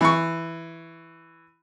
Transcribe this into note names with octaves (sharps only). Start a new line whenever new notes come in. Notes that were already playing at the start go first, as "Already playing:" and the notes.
E3 C#6